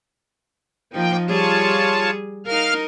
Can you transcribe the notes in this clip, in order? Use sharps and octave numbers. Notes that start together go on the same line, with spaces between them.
F3 A#3 D#4 G5
G3 F4 G#4 C#5 A5
D#4 A#4 F5 F6